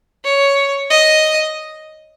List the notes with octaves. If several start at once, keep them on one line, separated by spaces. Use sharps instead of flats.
C#5
D#5